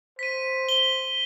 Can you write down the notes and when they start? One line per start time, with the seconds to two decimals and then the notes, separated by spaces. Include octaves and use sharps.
0.19 C5 B6 D#7
0.69 G7